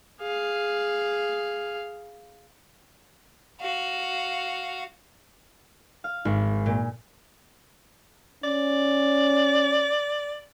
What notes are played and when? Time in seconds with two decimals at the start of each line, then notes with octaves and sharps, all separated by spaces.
0.22 G#4 F5
3.61 F#4 F5
6.04 F5
6.25 G#1
6.66 A#2
8.44 C#4 D5